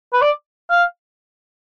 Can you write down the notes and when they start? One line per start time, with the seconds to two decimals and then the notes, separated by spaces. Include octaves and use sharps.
0.13 B4
0.22 D5
0.70 F5